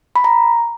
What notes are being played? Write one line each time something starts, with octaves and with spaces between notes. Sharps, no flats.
B5
A#5